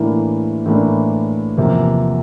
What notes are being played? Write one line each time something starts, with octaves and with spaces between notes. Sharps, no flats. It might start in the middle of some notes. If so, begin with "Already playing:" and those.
Already playing: A2 E3 A#3 D4
A2 E3 A#3 D4
E2 C3 F3 A#3